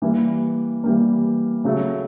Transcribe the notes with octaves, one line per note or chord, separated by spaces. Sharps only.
E3 G3 A#3
E3 G3 A#3
C#3 F#3 A3